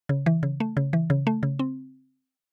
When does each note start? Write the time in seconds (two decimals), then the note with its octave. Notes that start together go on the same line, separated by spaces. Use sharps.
0.09 C#3
0.26 E3
0.43 C#3
0.60 A3
0.77 C#3
0.93 E3
1.10 C#3
1.27 A3
1.43 C#3
1.59 C4